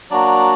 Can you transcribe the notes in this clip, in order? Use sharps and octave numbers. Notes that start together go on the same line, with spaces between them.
F#3 A#3 D4 F#4 D5